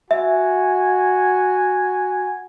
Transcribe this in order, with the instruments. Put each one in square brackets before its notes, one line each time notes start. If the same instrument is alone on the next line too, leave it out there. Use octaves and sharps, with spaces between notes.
[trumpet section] F#4 G#5 [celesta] E5